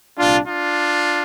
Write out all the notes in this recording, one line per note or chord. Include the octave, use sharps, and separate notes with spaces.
C2 A#2 G3 D4 F4
D4 F4